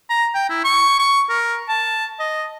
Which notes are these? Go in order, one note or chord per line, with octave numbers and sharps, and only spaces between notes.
A#5
G5
E4
C#6
C#6
A#4
A5
D#5